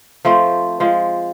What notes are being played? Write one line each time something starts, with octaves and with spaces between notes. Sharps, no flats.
F3 A3 C4
F3 G#3